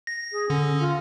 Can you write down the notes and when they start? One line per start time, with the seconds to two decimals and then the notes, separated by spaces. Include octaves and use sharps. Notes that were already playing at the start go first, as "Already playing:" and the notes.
0.07 A#6
0.32 G#4
0.50 D3 C#4
0.80 F4